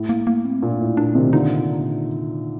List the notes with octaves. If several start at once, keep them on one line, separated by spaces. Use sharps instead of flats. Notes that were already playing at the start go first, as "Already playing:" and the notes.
Already playing: A2
A#3
A#3
C4
A#2 D4
A2
A#2 D4
C3 D#3
A#2 D3 D#4